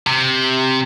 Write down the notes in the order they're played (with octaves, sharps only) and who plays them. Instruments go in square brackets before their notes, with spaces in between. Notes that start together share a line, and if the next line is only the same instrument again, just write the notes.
[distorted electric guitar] C3